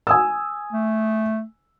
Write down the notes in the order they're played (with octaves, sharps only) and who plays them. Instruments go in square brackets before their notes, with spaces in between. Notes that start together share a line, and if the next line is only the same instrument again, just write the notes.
[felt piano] G#5 D#6 E6
[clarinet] A3